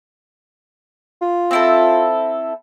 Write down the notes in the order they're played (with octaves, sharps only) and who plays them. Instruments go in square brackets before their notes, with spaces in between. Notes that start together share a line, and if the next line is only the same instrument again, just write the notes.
[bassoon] F4
[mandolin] C4 E4 A4